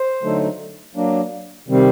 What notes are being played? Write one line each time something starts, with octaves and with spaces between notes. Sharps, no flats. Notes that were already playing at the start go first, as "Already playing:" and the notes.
Already playing: C5
D3 F#3 A3 D#4
F#3 A#3 D4
C3 D#3 G3 C4